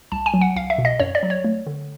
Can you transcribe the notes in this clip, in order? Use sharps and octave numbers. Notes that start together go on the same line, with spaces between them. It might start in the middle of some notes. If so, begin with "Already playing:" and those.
C2 A5
G#5
F#3
F#5
C2 F5
E5
B2
D#5
F#2 C#5
D5
F#3
C#5
A3
D3